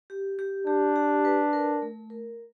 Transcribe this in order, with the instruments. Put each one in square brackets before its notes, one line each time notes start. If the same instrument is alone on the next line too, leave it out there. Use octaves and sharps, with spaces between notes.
[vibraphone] G4
G4
[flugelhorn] D4 [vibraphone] G4
[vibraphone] G4
B4
A#4
A3
A#4